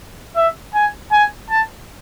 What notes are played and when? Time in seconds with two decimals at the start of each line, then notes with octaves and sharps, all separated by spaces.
0.36 E5
0.74 G#5
1.12 G#5
1.49 A5